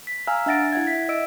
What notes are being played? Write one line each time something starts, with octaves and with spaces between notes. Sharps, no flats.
B6
F5 G#5 A#5 E6 F6
D4 E5 F#5 A6 A#6 D7
E4 E5 F#5 G#6
B6
D#5 E6 D7